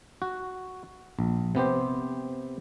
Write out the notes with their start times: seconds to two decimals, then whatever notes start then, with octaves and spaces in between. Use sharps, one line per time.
0.22 F#4
1.19 A#1
1.55 C3 B3 G4 C5